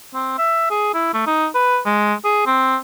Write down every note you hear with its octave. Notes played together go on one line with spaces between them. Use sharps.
C4
E5
G#4
E4
A3
D#4
B4
G#3
G#4
C4